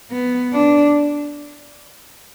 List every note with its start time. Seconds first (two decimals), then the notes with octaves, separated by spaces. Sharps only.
0.11 B3
0.53 D4